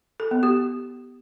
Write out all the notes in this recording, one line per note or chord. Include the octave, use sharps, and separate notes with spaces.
A4
B3
G4